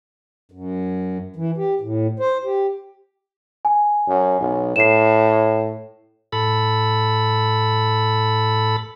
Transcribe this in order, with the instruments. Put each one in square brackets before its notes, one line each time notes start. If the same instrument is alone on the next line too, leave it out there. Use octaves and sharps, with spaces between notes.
[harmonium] F#2
E3
G4
A2
C5
G4
[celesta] G#5
[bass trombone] F#2
B1
[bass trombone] A2 [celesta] C7 E7
[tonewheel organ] A2 A4 B5